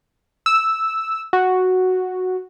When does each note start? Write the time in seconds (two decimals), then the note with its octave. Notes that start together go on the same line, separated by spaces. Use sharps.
0.46 E6
1.33 F#4